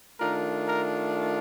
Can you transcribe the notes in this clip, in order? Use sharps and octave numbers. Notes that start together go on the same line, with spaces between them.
D#3 A3 D4 F4 A#4
A#4